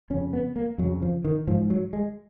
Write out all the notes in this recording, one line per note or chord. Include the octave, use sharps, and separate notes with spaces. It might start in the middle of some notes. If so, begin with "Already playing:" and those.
F2 C#3 C#4
B3
A#3
F2 C#3 F#3
F3
D#3
G#2 F3
F#3
G#3